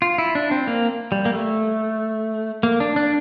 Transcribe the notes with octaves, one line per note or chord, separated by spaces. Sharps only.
F4
E4
D4
C4
A#3
G3
A#3
A3
A#3
D4
D4